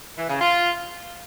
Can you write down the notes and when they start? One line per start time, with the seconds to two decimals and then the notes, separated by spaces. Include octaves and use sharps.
0.18 E3
0.29 C#3
0.40 F4